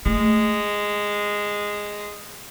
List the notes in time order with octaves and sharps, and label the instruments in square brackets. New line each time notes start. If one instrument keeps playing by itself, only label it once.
[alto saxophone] G#3 [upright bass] A3